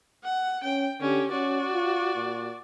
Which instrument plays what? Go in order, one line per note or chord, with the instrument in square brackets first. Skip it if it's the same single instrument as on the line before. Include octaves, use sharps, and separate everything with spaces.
[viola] F#5
[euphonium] C#4 [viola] G5
[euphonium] D3 [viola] C#4 G4
[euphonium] C#4 [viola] F#4 D5
[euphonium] F4
A#2